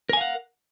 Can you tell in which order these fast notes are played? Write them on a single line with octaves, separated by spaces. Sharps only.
A#4 G#5 F5 F#5